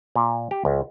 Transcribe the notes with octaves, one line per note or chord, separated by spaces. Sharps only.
A#2
G4
C#2